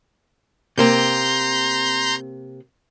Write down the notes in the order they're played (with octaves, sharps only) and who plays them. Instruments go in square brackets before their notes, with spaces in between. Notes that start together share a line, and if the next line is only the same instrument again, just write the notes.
[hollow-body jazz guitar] C3 A#3 C4 [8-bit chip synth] A#5 C6 G6